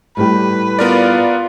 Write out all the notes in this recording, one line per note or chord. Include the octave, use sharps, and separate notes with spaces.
A2 G3 G4 B4
B3 F4 A#4 D5